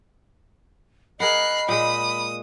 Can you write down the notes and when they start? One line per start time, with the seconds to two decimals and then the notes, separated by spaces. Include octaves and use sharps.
1.20 G#4 A#4 D#5 F#5 B5 F#6 C7
1.69 A#2 G#3 D#6